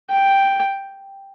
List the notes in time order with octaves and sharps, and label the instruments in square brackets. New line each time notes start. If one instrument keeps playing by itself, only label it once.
[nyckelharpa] G5